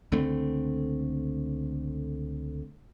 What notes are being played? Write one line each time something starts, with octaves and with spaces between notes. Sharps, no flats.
C#2 D3 A3 C4